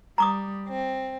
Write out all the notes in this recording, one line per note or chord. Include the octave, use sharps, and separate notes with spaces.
G3 A#5 D6 D#6
C4